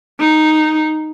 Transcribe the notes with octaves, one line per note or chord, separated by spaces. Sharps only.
D#4